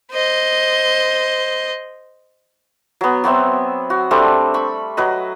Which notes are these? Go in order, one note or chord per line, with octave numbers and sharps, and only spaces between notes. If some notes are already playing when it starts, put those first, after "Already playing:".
C5 D#5
F#3 B3
F#3 B3 C4 E5
F#4
G3 A3 C4 D4
B5 C#6
F#3 B4 D#5